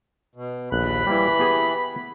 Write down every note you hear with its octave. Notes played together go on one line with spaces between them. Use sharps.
B2
A#1 D#2 B5 F#6
E3 G3 A#3 E4
B3 G4 G#4